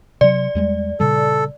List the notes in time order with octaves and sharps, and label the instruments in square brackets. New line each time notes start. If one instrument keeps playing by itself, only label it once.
[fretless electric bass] C3 F#3 [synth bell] D5
[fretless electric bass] E2 G3 G#3
[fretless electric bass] A#2 C#3 G3 [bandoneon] A4